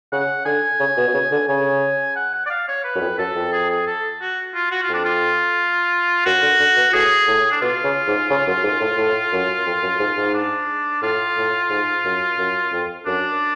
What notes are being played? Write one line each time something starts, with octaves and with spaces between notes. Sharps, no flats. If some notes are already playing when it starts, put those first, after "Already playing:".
C#3 F#5
D3 G#5
C#3
B2
B2
C#3
D3
C#3 G#5
F#5
F#5
D5
F5
C#5
B4
F#2
F2
F#2 A4
F2
G#4
G#4
A4
F#4
F4
F#4
F4
F2 D4
F4
F#2 F#4
D3
D3
B2
A2 G#4
A2
D4
B2 F4
C#3
G#2
C#3
F#2
G#2
A2
A2
F#2
F2
F#2
G#2
G#2
D4
A2 F4
A2
G#2
F#2
F#2
F2
F#2 D4